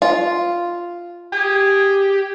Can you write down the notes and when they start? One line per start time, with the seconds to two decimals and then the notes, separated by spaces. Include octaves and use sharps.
0.02 F4
1.32 G4 G#4